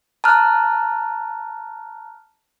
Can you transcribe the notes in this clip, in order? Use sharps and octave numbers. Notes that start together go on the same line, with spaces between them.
A5 A#5 F6 F#6